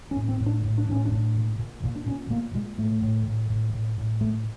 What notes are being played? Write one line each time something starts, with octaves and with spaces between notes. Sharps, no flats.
C#4
A2
C4
A2
D4
A2
D4
A2 C#4
D4
A2
A#2
A#2
A#2
D4
A#2 C#4
A#2 A#3
A#2 G#3
A2 A3
A2
A2
A2
A2
A2
A#2 A3